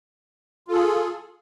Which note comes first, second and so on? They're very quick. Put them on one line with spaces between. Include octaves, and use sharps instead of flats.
F4 A4 G#4